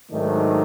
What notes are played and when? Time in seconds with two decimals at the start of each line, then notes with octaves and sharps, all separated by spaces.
0.11 G#2 D#3 F#3 A3 D4